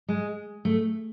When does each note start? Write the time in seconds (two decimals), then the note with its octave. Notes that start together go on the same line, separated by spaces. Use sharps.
0.09 G#3
0.65 A3